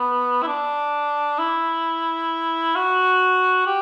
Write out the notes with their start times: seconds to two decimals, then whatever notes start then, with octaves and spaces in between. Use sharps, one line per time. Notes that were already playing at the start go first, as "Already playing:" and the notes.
Already playing: B3
0.43 E4
0.47 D4
1.38 E4
2.75 F#4
3.66 G4